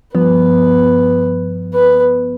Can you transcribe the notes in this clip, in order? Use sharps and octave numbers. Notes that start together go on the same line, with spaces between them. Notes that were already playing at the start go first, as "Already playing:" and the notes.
G2 F3 B3 B4
B4